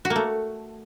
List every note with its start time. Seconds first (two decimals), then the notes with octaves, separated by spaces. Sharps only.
0.05 F#4
0.10 A#3
0.16 A3